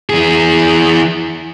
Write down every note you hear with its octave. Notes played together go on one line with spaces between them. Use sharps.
E3 G#4